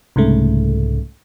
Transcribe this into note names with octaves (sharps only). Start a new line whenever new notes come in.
C2 G#2 C#3 A3